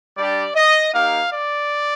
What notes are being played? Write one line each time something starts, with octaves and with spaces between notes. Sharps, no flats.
G3 D4 G4 D5
D#5
A#3 D#4 G4 F5
D5